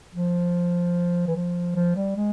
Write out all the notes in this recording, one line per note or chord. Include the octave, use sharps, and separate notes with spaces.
F3
E3
F3
F3
G3
G#3